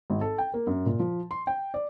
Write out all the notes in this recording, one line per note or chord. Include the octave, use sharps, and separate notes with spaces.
G#1
A4
G5
A#3
F#2
A#2
F3
C6
G5
D5